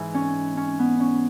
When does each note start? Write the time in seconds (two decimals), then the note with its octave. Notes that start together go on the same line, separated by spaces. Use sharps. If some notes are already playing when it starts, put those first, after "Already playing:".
Already playing: G#2 E3
0.14 C#4
0.57 C#4
0.79 B3
1.00 C#4